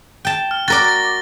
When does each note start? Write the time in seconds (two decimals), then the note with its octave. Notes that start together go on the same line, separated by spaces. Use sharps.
0.25 G5 A5
0.51 F6
0.68 F#4 A#4 D5 A6
0.85 A6 A#6